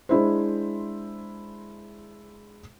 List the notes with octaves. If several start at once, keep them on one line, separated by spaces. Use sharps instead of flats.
G#3 D4 E4 C5